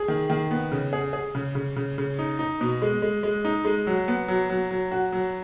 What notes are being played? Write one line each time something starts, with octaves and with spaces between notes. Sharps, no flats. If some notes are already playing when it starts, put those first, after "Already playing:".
Already playing: G#4
D#3
D#3
B3
C#3
G#4
G#4
C#3
C#3
C#3
C#3
D#4
D#4
B2
G#3
G#3
G#3
D#4
G#3
F#3
B3
F#3
F#3
F#3
F#4
F#3